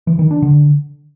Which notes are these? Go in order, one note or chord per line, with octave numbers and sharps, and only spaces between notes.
E3
D#3
D4
D3